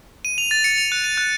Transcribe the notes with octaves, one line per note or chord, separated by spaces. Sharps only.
D#7
F7
A6
C#7
F7
F#6
D#7
F#6